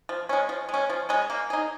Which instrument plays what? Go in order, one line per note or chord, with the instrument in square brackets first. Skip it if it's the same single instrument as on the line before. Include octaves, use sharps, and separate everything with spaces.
[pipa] F3
G#3 C#4
F3
G#3
C#4
F3
G#3 C#4
A#3
D#4 G#4